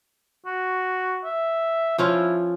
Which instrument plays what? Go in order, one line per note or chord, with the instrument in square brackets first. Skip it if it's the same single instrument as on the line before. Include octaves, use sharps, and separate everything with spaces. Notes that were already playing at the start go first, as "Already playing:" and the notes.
[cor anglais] F#4
E5
[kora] F3 C#4 F4 [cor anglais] E4